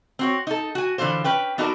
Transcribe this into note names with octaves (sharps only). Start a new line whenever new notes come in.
C4 F#4 C#5
D#4 A4
F#4 G#5
D3 E3 C4 F4 C5
C#4 B4 G5
B3 D#4 F#4 A4 A#4 D5